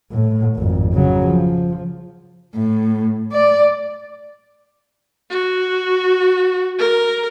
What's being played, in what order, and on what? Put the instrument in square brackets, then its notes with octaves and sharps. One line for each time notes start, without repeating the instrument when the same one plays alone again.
[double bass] A2
G#1 F2
C#3 F#3
F3
[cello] A2
D5
[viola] F#4
A#4